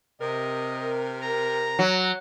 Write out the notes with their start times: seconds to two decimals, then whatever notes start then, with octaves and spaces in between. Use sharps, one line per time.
0.21 C3 A#4 D#5
1.22 A#5
1.79 F#3